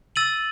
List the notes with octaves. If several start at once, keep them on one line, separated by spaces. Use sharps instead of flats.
E6 A6 D#7 F#7